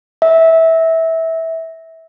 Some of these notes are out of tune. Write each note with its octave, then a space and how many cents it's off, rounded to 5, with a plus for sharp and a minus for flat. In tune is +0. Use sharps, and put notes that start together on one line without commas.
E5 -20